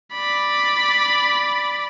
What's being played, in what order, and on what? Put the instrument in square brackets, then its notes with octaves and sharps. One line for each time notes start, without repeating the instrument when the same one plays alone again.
[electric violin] D5 B5